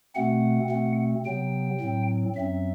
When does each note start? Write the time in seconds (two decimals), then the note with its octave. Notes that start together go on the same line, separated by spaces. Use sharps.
0.15 B2 A3 C4 F#5
0.70 B2 A3 C4
1.25 C3 F#3 B3 G5
1.80 A2 F#3 C4
2.36 F#2 F#3 C4 E5